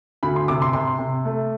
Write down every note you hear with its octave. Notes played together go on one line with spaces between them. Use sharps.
D2 B5
C6
C3 D6
C6
C3 C6
C3
A3